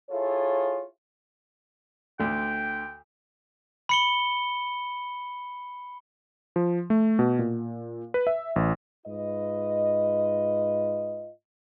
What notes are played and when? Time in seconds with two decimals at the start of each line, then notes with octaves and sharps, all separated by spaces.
0.10 E4 F4 G#4 A4 C#5
2.19 D2 D3 G5
3.89 B5 C#7 G7
6.56 F3
6.90 A3
7.19 B2
7.39 A#2
8.14 B4
8.27 E5
8.56 A1
9.06 G#2 F4 B4 D#5